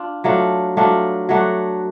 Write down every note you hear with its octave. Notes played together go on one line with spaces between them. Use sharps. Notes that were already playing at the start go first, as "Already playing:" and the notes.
Already playing: D4 F4
F#3 A3 D4 F4
F#3 A3 D4 F4
F#3 A3 D4 F#4